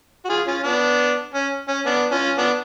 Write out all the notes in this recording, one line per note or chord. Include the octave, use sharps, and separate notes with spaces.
F#4
F4 G#4
C#4 F4
B3 D4
C#4
C#4
B3 D4
C#4 F4
B3 D4